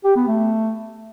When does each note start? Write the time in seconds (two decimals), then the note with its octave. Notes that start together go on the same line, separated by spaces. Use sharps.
0.04 G4
0.16 B3
0.27 A3